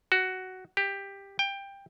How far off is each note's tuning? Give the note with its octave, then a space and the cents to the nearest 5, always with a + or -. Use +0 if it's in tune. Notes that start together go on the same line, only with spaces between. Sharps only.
F#4 +10
G4 +10
G5 +15